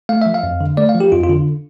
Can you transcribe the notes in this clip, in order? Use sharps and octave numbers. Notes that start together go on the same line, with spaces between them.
A3 F5
F3 E5
F5
F2
D3
A3 D5
F5
F3
G4
F2 F4
F4
D3